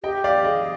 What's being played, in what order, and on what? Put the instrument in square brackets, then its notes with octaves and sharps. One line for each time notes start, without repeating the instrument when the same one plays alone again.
[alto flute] G4 [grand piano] D#5 G5
[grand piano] D5 F5
[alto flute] G#4 [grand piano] D#5